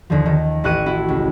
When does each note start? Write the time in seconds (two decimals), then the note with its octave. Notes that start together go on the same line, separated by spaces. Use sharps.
0.10 D#2 D3 F3
0.26 D#3
0.64 A1 E4 C#6 F#6 G#6 D#7
0.86 E4 F#4
1.08 C#2